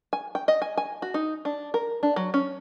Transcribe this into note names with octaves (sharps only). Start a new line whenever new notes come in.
G#5
G5
D#5
G#5
G#5
F#4
D#4
D4
A#4
D4
F#3
C#4